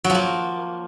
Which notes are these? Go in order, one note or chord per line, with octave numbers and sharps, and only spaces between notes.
F#3
F3
A#3